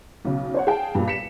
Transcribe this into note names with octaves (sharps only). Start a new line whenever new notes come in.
B1 C#3
C5 C#5 F#5
G#4 F5 G5 A5
G2 A#2
B6 C#7 E7